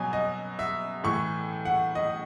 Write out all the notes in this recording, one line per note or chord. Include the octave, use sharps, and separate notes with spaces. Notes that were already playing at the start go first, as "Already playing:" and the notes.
Already playing: B2 F#3 G#5
D#5
E5
A2 E3 C#6
F#5
D#5